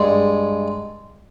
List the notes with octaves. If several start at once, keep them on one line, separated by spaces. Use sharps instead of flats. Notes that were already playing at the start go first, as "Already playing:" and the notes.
Already playing: G2 G#3